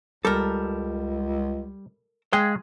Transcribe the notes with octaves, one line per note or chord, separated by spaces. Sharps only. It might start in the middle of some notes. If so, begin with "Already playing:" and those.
C#2 G3 A4 A#4
G#3 G#4 F5 G5